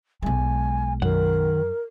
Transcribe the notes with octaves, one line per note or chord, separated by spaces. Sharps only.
B1 G#3 G#5
F#2 D#3 A#4 F#5